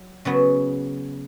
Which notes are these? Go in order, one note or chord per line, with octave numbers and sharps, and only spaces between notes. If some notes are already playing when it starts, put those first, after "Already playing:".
Already playing: F#3
C#3 F#3 B3 F#4